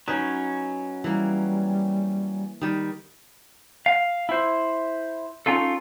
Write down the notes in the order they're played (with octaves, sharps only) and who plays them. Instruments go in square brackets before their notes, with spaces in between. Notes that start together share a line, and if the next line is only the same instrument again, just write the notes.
[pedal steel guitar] F#3 C#4 [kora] D#4 B4
[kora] E3 A#3 [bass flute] G3
[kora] D#3 G3
[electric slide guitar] F5
E4 C5
C#4 D#4 F4 A4